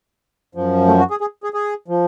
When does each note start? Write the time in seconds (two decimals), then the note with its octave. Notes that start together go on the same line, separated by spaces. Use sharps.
0.55 F#2 F3
0.87 A3
0.99 F#4
1.11 G#4
1.21 G#4
1.44 G#4
1.54 G#4
1.88 F3